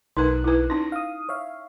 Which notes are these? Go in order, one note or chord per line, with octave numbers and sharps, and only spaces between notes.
B1 D#4 A#4 B4 F#6
E4 B4
C#4 D#4 A#6
F5 D#6
C#5 E5 F5